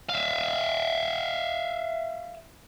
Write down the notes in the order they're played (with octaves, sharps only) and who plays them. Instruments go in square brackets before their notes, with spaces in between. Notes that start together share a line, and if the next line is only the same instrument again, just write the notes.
[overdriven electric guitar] E5 F5